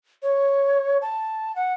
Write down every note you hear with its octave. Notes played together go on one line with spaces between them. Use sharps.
C#5
A5
F#5